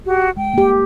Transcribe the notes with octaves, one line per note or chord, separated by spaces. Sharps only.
F#4 G4
G#3 G5
A#3 G4